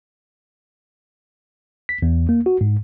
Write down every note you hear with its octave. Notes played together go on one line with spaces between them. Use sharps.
B6
E2
A#3
F#4
G#2